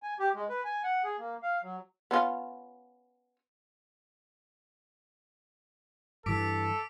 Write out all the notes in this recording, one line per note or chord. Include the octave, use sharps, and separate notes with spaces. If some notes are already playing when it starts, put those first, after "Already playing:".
G#5
G4
G#3
B4
G#5
F#5
G#4
A#3
F5
F#3
B3 C#4 F4
G2 E3 A4 D6 B6 D7